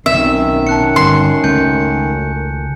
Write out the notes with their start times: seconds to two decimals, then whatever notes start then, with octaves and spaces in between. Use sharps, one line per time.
0.06 B1 F#2 B2 D#3 C4 E5
0.67 A5 F#6 C#7
0.96 G1 C6
1.44 C#2 A3 C#4 G#5 G6 C#7